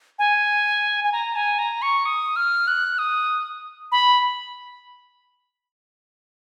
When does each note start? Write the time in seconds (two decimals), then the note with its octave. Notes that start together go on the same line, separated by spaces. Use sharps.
0.19 G#5
1.04 G#5
1.12 A#5
1.36 G#5
1.59 A#5
1.82 C#6
2.06 D#6
2.36 F6
2.67 F#6
2.98 D#6
3.92 B5